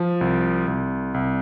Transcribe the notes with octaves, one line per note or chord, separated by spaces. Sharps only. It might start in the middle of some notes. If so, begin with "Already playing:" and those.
Already playing: F3
C2
C2
C2